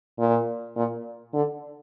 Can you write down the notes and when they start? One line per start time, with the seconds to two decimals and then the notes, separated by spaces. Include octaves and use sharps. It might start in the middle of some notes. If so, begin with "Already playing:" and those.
0.19 A#2
0.76 A#2
1.34 D3